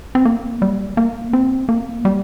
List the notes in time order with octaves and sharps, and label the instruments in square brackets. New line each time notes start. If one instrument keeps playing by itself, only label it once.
[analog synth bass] C4
A#3
G3
A#3
C4
A#3
G3